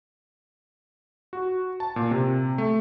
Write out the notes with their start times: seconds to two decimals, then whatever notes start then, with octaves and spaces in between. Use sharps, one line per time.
1.33 F#4
1.80 A5
1.96 A#2
2.11 C3
2.58 A3